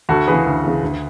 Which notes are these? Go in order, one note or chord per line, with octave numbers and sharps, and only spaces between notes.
D2 F#4 A4
C#3 E3 G#4 B4
D2
C#3 E3
D2